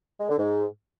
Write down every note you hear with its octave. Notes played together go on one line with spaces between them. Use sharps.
G#3
D3
G#2